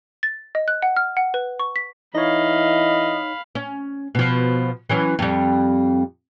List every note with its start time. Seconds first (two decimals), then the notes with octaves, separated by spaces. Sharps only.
0.23 A6
0.55 D#5
0.68 F#6
0.82 F#5
0.96 F6
1.17 F#5
1.34 B4
1.60 C#6
1.76 B6
2.15 E3 D#4 C#5 D#5 F5 B5
3.55 C#4
4.15 B2 F3
4.89 E3 F#3 C#4
5.19 F2 G3